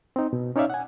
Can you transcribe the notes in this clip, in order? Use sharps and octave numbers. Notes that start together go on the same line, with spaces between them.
C4 D#4
B2
C#4 D#4 C#5 D5 E5 F5
F#5 G#5